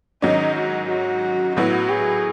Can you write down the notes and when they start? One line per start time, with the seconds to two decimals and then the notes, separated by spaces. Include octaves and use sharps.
0.22 G#2 D#3 F#3 C#4 D#4
0.56 F#4
0.90 F#4
1.56 A2 F#3 B3 E4 F#4
1.89 G#4